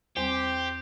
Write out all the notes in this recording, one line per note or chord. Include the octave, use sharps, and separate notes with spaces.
E2 G3 C4 G4 C5